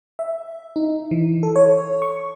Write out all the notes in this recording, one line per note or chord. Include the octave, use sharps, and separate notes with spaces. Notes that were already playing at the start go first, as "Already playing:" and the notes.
E5
D#4
E3
A4
C#5
C#6